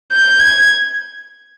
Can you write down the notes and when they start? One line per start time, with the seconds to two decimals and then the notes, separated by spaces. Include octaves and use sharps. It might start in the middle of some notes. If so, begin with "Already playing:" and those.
0.12 G6
0.40 G#6